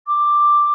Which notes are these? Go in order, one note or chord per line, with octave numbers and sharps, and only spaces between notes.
D6